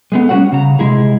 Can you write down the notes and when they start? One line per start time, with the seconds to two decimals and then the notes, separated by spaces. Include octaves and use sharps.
0.12 G#3 A3 B3
0.29 G3 C#4 D#4 F#4 C#5 F#5
0.52 C#3 A#5
0.79 C3 G#3 E4 G#4